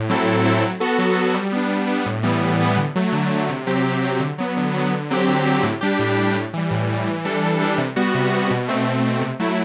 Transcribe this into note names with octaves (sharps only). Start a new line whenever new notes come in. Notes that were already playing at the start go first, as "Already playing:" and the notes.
Already playing: A2
F#3 C4 E4 A4
A2
F#3 C4 E4 A4
F#3
B3 F#4 A4
F#3
B3 F#4 A4
G3
B3 D4
G3
B3 D4
A2
E3 G3 B3
A2
E3 G3 B3
D3
F#3 A3
D3
F#3 A3
C3
F#3 C4 G4
C3
F#3 C4 G4
D3
F#3 B3
D3
F#3 B3
D3
F#3 C4 G4
D3
F#3 C4 G4
A2
G3 D4 G4
A2
G3 D4 G4
A2
E3 G3
A2
E3 G3
E3
G3 D4 A4
E3
G3 D4 A4
C3
G3 B3 F#4
C3
G3 B3 F#4
B2
A3 C4
B2
A3 C4
C3
F#3 A3 E4